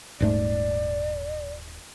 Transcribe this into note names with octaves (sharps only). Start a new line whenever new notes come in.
D#1 G#2 A3 D5